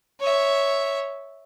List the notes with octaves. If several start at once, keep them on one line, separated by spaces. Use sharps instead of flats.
C#5 E5